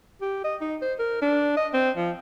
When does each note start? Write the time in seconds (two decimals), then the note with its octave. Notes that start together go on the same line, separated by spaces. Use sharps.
0.21 G4
0.44 D#5
0.61 D#4
0.82 C5
0.99 A#4
1.22 D4
1.57 D#5
1.73 C4
1.97 F3